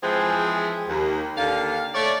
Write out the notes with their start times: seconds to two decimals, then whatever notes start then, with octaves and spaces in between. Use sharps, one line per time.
0.03 E3 F3 G#3 C4 G#4
0.87 D#2
1.37 D#2 D3 F5
1.95 A3 C#5 D5